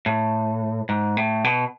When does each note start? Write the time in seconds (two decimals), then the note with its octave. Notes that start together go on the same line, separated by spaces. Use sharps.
0.06 A2
0.89 G#2
1.17 A2
1.44 B2